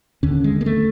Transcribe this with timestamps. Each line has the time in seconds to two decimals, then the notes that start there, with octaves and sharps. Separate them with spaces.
0.23 D#2 D3 C#4
0.44 G#3
0.61 A#3
0.66 A3